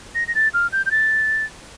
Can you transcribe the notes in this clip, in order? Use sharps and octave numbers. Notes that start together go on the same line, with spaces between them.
A#6
A#6
A6
F6
G6
G6
A6